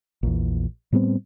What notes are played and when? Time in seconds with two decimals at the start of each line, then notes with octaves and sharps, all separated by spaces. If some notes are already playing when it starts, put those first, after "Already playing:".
0.23 A#1 E2
0.92 A2 G3 B3 C4